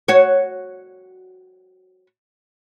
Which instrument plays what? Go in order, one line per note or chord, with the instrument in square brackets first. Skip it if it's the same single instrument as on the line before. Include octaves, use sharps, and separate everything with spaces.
[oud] F#4 C#5